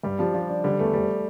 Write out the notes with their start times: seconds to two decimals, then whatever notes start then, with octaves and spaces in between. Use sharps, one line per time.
0.03 G2 G3
0.19 F3 G3
0.33 F3 D4
0.49 D4
0.64 D3 G3
0.79 E2 A3
0.93 F1 G3